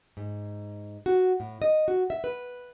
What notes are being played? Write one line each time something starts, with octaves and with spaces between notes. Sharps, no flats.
G#2
F#4
A2
D#5
F#4
E5
B4